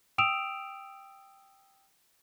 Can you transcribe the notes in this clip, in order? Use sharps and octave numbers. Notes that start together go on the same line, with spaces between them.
G5 D#6 E6 D7 E7 F7